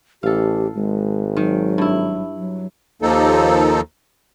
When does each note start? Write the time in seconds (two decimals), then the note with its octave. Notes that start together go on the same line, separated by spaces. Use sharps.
0.23 A1 G4 A4 F5
0.75 G#1 G#3
1.37 D#3 F#3
1.78 G2 E4
2.37 F#3
3.02 D#2 F3 A#3 D#4 A4